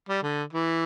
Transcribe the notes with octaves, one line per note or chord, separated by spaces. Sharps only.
G3
D3
E3